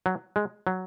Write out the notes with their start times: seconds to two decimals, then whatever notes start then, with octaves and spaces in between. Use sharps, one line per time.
0.06 F#3
0.36 G#3
0.67 F#3